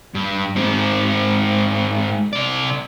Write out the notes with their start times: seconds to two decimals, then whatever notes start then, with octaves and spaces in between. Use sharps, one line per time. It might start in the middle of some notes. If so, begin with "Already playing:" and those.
0.14 G2
0.56 G#2 C4
2.33 C3 D5